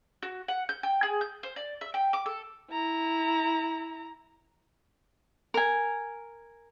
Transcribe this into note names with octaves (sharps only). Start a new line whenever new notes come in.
F#4
F#5
G6
G5
G#4
G6
C5
D5
E5
G5
D6
A4
E4 A#5
A#4 G#5